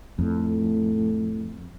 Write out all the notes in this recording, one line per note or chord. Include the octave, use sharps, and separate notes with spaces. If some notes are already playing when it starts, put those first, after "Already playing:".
F2 A2